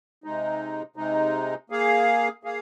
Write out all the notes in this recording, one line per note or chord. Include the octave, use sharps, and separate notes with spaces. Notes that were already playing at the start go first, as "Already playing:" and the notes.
C3 G#3 D#4
C3 G#3 D#4
A#3 G#4 F5
A#3 G#4 F5